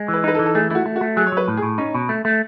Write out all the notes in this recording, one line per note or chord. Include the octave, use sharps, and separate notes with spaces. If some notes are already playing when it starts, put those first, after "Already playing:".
Already playing: G#3
E3 B4
D#4 B4
A4
E3
A4
A3 G#4
A3 E4 F#4
A3
F#4
A3
F#3 G#4
C#5
F#3 B4
A2
G#4
A2
C#4 D#4
B2
A3
A3